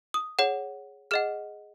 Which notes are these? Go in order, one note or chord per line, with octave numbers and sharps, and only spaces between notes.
D#6
G#4 C#5 F#5
G#4 D#5 F#5 F6